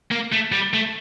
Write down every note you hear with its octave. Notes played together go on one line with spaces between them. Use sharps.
A#3
A3
G3
A3